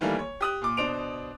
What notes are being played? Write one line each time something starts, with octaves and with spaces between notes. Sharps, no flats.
D#3 E3 G3 A3 A#3
C#5
G4 D#6 F#6
A#2 D6
B2 D4 C5 D7 F7